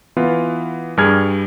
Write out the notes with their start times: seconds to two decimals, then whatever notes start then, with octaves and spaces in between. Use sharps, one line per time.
0.17 E3 B3 F4
0.97 G2 G3 G#4 F6 G#6